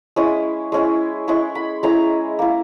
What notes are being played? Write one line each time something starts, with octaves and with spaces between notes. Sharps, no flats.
G#3 C#4 E4 D#6
G#3 C#4 E4
G#3 C#4 E4 C#6
B5
G#3 C#4 E4 A#5
A#3 E4